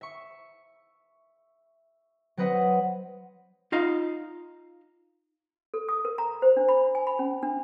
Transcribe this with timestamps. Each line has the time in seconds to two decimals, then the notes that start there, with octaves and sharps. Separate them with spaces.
0.01 E5 C#6
2.37 F#3 C4 B4 D#5 F#5
3.72 D#4 F4 D#5 F5
5.74 A4
5.89 D#6
6.05 A#4
6.18 A#5
6.42 C5
6.57 D4
6.69 B5
6.95 G#5
7.07 B5
7.19 C#4
7.43 D4